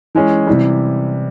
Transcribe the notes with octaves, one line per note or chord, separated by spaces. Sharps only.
E3 G#3 C#4
C3 E3 G3